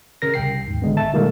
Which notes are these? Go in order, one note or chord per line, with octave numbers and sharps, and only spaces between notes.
C#3 A#4 A#6
C2 C3 G5 C7
D#2 G#2
G#1 D3 G#3 B3
E5 A5
B2 D#3 G3 G#3 A#3 A4